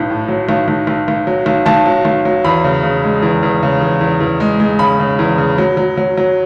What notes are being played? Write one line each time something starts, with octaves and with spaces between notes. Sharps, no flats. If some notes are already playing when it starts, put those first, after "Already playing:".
Already playing: B1 A2
A2
F#3
B1
B1
B1
B1
F#3
B1
B1 A5
F#3
B1
F#3
E2 B5
C#3
C#3
G#3
E2
E2
C#3
E2
E2
E2
G#3
G#3
C#3 B5
C#3
E2
C#3
F#3
F#3
F#3
F#3